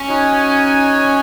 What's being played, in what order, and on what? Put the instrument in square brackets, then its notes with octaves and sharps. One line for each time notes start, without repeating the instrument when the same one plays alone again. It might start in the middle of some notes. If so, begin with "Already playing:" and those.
Already playing: [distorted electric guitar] C#4
[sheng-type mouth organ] D#4 F#4 C#5 G#5